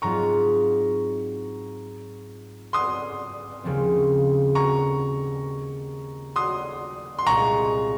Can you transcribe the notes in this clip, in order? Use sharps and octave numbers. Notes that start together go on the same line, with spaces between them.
G#2 F#3 C4 F4 A#5 C#6
C6 D#6
D#2 C#3 F3 G#3 C4
A#5 C#6
C6 D#6
C6
C2 A#2 G#3 A#5 C#6